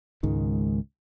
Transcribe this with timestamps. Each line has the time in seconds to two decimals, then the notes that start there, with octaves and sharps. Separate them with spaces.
0.23 C#2 G#2 D#3